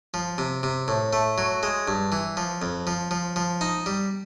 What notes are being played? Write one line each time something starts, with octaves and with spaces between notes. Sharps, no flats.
F3
C3
C3
A2
A3
F#3
G#3
G2
E3
F3
F2
F3
F3
F3
D#4
G3